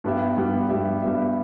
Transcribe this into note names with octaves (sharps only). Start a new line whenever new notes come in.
G2 G3 B3 G4 E5
G2 G3 B3 G4 E5
G2 G3 B3 G4 E5
G2 G3 B3 G4 E5